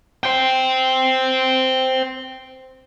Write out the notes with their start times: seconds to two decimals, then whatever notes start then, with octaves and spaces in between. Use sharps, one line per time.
0.24 C5 G5